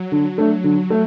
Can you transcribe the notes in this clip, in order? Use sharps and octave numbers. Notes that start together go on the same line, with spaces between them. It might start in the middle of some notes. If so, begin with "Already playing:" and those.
Already playing: F#3
D3
A3 D4
D3
A3